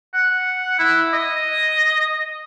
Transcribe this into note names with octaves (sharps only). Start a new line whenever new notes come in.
F#5
E4
D#5